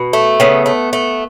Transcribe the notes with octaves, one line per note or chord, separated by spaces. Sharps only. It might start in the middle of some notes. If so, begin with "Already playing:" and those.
Already playing: B2
A3
C#3 B3
A3
A3